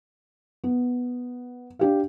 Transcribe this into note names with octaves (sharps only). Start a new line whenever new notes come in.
B3
D4 G4 F5